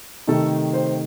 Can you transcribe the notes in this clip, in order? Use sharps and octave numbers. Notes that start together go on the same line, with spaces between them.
C3 D#3 A3 D#4 A4
C5